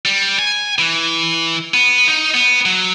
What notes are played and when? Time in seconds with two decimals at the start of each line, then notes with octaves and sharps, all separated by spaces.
0.06 G3
0.39 G#5
0.79 E3
1.74 B3
2.08 D#4
2.34 B3
2.66 F#3